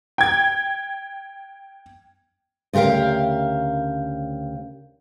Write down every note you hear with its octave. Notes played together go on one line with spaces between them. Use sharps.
G5 G#6
D2 C#3 G4 A#4 F5